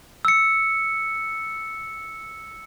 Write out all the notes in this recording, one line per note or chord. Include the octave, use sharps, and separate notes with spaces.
E6 C#7